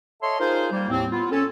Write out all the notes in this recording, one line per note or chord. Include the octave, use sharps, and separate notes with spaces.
A4 C#5 D#5 E5 C6
D#4 F4 G#4 A#4 C5
G3 A#3
D#2 A2 C4
B3 F4
C#4 A4